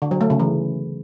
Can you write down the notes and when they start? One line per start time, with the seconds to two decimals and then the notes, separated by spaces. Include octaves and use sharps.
0.02 D3
0.11 F#3
0.21 A3
0.30 C#3
0.40 E3